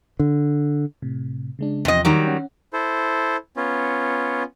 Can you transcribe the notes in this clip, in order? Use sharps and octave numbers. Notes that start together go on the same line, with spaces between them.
D3
A2 C3
C#3 G#3 D4
E2 C3 F3 D#5
D#3 F#3 G3
C#4 F#5
E4 A4 C5
B3 C#4 F4